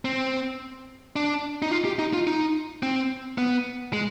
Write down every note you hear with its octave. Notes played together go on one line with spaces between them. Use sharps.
C4
D4
D#4
F4
G4
D#4
F4
D#4
C4
B3
G#3